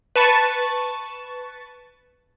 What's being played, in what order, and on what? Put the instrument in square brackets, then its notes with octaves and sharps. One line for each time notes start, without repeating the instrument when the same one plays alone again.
[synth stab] B4 A5 C#6 A6